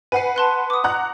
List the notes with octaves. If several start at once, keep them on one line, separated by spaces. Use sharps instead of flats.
B4 F#5 G#5 C7
A5 C6 F#6
D6 D#6
F#5 A#5 F#6